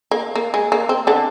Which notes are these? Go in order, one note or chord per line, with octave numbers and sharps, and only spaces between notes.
A#3
A#3
G#3
A#3
C4
D3 D4